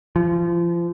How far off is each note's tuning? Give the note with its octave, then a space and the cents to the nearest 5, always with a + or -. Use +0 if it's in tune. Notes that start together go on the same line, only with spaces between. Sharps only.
F3 -30